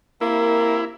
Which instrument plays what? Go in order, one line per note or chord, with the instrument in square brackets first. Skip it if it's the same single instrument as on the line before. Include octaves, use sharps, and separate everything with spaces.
[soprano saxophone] A#3 [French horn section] C4 G4 A#4 [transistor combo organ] E4